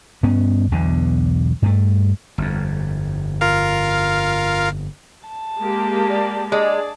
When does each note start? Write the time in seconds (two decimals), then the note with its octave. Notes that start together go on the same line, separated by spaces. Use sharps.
0.23 G2 B3 C#4
0.72 B1 E2 B2 D3
1.62 G2 A3
2.38 G1 F2
3.41 F4 A#4 F5
5.27 A5
5.59 G#3 A#3 G4
6.10 D5
6.52 G#3 D4 G#4 D5